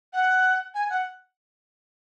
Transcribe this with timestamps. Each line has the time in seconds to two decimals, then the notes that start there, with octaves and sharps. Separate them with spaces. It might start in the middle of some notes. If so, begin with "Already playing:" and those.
0.13 F#5
0.74 G#5
0.90 F#5